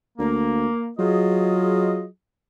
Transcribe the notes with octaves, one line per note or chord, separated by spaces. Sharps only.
D2 A#3
F#3 F4 G#4 D#5